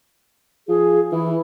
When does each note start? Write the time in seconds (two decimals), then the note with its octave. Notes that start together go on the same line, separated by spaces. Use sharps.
0.68 F3 G#4
1.12 E3 E4